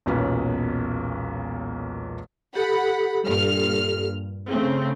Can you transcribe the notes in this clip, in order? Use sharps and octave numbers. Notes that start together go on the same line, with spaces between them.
E1 B1 A#2 C#4 B4
G4 A4 F#5 B5
G2 A#2 F6
C#3 A3 C4